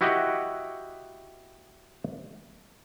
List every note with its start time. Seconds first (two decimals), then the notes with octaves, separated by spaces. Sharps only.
0.01 E4 F#4 G4 D#5 E5 F#5